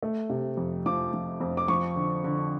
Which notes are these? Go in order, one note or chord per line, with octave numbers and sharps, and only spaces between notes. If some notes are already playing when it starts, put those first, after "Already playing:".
A3
C3
F2
F3 D6
F3
F2
D6
F3 C#6
D3
D3